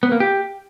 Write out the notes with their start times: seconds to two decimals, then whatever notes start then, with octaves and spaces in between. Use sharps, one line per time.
0.03 B3
0.12 A#3
0.20 G4